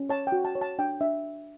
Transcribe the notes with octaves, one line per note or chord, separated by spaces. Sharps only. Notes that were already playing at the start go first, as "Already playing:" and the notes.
Already playing: C#4
C#5 A5
G5
F#4
A5
C#5
A5
D4 G5
D4 E5